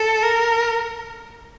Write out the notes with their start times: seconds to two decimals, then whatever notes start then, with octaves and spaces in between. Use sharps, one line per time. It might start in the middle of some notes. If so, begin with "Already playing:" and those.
Already playing: A4
0.23 A#4